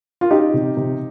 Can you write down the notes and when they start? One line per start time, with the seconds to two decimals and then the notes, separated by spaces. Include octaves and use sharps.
0.21 F4
0.31 C#4 D#4 G4
0.54 C3
0.77 C3